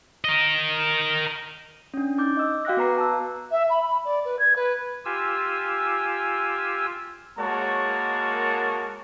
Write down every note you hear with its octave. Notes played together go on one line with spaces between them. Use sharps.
A#4 D#5
C#4 D4
D#4 D6 G6
D#5 E6
F#4 F5 G5 D6 F#6 A#6
B3 B4 A#5 C7
A5 E6
E5
B5
B5
D5
B4
G#6
B4
F4 G4 G#5 E6
G#3 A#3 F#4 A#4 C#5 A5